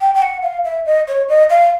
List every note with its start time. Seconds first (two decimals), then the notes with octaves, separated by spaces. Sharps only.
0.01 G5
0.15 G5
0.22 F#5
0.43 F5
0.65 E5
0.86 D#5
1.08 C#5
1.29 D#5
1.50 F5